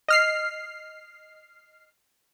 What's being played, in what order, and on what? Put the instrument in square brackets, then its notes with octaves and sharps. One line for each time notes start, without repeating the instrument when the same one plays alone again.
[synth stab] D#5 F6 C7